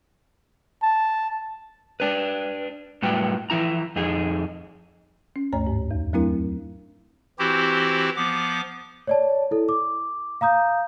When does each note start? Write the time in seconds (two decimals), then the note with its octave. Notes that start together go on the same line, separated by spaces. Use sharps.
0.83 A5
2.00 D4 B4
3.02 A2 F#3 G3 F#4 B4 G5
3.50 E3 F3 E4 A#5
3.96 F2 D#4 G#4
5.36 C#4
5.53 D2 G2 A3 C#5 A#5
5.67 G#2
5.91 E2
6.13 F#3 A3 C4 D4 E4 A#4
7.39 E3 C4 E4 F#4 G4 C5
8.16 F3 B3 D6
9.07 C#5 D5 A5
9.51 E4 A4
9.69 D6
10.41 F5 A#5 D#6 G6